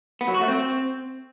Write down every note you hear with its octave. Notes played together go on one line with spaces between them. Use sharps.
B3
F#3
F#4
A3
C4